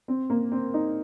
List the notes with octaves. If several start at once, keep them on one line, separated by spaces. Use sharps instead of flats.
C4
A#3
C4
D#4